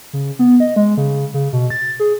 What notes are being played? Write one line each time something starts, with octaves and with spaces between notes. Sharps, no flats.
C#3
B3
D#5
G#3
C#3
C#3
B2
A6
G#4